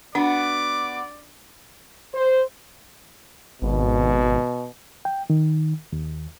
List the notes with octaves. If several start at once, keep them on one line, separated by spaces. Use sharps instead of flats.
B3 D4 F#4 D5 D6
C5
G#1 B2
G5
D#3
D#2